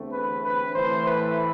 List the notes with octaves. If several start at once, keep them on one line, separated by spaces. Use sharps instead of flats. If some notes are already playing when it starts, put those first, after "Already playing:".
Already playing: E2 D3 A3 C4
B4
B4
A2 E3 A3 C5
B4